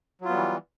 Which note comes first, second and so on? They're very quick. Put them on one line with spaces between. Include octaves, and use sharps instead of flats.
F#3 F4 B3 G3 E3